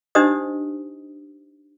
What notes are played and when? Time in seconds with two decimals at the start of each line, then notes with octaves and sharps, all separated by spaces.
0.15 D4 D#4 G4 C5 D#5 D#6